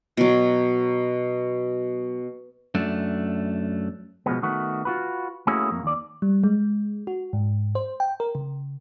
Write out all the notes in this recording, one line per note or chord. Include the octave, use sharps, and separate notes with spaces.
B2 F#3
F#2 A3 D4
B2 F3 G#3 B3
D#3 A3 B3 F#4
F4 F#4 B4
A3 A#3 C#4 E4 F#4 G#4
F2 A#3
D#2 D5
G3
G#3
F#4
G#2
C5
G5
A#4
C#3